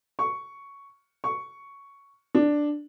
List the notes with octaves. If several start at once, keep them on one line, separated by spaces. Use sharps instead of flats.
C#6
C#6
D4